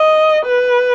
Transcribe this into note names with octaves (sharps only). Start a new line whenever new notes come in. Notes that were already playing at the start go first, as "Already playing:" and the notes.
Already playing: D#5
B4